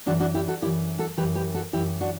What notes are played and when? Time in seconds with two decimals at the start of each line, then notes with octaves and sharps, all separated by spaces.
0.06 F#2 E3 D4 F#4
0.20 D4 F#4
0.34 E4 G4
0.48 F#4 A4
0.62 F#2 E4 G4
0.66 E3
0.98 F#4 A4
1.17 F#2 E3 G4 B4
1.35 G4 B4
1.54 F#4 A4
1.73 F#2 E3 E4 G4
2.01 D4 F#4